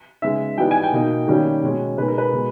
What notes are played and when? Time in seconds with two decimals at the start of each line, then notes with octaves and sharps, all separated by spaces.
0.22 C#3 G#3 B3 D#4 E5
0.58 E3 G3 B3 D#4 G5
0.71 G#5
0.84 G5
0.92 B2 A#3 D#4
1.28 D#3 G3 A#3 C#4
1.63 B2 G#3 C#4
1.97 B2 G#3 D#4 B4
2.08 A#4
2.18 B4
2.32 B2 G#3